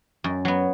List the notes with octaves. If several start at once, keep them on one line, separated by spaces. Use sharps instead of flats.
F#2
F#3 B3